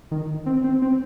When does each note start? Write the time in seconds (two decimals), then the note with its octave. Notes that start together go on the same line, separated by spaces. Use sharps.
0.11 D#3
0.46 C4
0.64 C4
0.82 C4